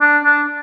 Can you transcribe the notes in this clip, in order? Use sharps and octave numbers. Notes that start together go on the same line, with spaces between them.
D4
D4